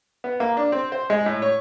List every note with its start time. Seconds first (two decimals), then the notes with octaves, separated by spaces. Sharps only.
0.24 B3
0.40 A#3
0.57 D4
0.72 C4
0.92 C5
1.10 G#3
1.26 A2
1.42 C#5